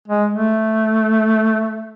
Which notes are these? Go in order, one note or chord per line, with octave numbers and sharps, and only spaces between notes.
G#3
A3